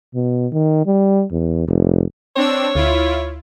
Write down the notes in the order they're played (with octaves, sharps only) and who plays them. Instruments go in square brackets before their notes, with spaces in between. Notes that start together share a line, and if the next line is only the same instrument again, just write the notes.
[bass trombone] B2
D#3
G3
E2
F1
[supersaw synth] C4 D4 E6 [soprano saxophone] C#5
[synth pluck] D2 [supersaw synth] E4 F4